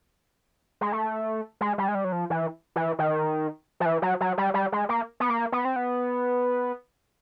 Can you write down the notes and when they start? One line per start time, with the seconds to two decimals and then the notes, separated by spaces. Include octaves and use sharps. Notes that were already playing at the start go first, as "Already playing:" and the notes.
0.81 G#3
0.92 A3
1.61 G#3
1.78 G3
1.88 G#3
1.95 G3
2.05 F#3
2.12 F3
2.30 E3
2.76 E3
2.99 D#3
3.80 F3
3.86 E3
4.02 F#3
4.21 F#3
4.38 G3
4.54 G3
4.72 G#3
4.89 A#3
5.20 B3
5.29 A#3
5.52 B3
5.65 C4
5.76 B3